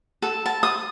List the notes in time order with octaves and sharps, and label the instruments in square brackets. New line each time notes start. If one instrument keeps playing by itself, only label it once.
[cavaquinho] A4
A5
D#6